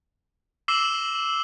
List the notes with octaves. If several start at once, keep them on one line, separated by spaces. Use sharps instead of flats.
D6 E6 C7 E7 F#7 G7